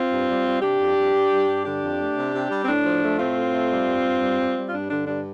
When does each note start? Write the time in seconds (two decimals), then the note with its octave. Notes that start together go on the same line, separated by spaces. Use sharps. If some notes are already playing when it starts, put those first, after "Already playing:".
Already playing: C4 F4
0.11 G2
0.29 G3
0.45 G3
0.62 C3 D4 G4
0.79 F2
0.96 F2
1.14 G2
1.32 G2
1.48 G2
1.65 D3 D4 G4
1.83 F2
2.00 A3
2.17 C3
2.33 C3
2.50 G3
2.64 C4
2.67 A2 D4
2.85 F3
3.02 A3
3.19 A2 C4 F4
3.37 A2
3.54 A3
3.71 G3
3.87 G2
4.05 G2
4.22 G3
4.39 G3
4.56 G3
4.69 F4
4.73 G2 D4
4.90 D3 D4
5.07 G2 D4